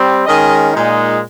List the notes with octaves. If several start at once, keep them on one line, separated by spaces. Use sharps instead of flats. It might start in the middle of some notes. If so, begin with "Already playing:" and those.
Already playing: G3 C4
D#3 G#3 C#4 D#5
A#2 G#3 D#4